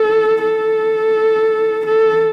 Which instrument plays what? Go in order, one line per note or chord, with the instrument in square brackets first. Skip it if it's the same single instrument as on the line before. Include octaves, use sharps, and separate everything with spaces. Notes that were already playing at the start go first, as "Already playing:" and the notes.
Already playing: [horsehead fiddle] A4
A4
A4